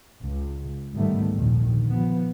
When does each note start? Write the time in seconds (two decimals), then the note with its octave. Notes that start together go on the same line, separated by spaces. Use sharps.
0.22 C#2
0.93 G1 G#2 D#3 G3 A3 B3
1.35 A#1 D#2 D3 D#3
1.89 F3 B3